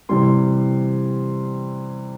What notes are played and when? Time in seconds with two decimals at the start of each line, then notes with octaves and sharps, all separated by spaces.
0.09 C3 E3 G3 C6